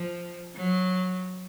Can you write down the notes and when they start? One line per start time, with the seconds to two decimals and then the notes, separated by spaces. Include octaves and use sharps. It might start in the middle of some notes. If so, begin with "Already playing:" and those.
Already playing: F3
0.56 F#3